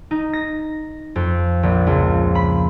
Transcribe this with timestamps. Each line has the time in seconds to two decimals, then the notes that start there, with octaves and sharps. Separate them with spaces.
0.11 D#4
0.33 A#6
1.16 F2
1.63 A#1
1.87 C#2
2.35 B5